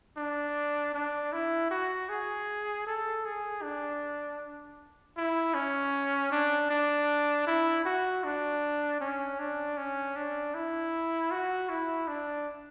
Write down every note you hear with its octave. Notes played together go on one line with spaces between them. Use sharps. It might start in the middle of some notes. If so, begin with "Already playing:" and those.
D4
D4
E4
F#4
G#4
A4
G#4
D4
E4
C#4
D4
D4
E4
F#4
D4
C#4
D4
C#4
D4
E4
F#4
E4
D4